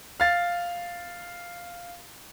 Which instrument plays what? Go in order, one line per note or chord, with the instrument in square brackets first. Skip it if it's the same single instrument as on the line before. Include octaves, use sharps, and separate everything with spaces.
[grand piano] F5 A6